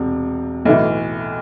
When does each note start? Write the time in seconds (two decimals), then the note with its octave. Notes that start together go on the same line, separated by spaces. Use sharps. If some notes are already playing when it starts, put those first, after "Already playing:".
Already playing: E1 C3
0.65 B1 A2 E3